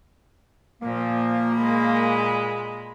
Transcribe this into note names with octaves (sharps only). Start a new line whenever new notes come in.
A#2 F3 A#3
A#2 G#3 B5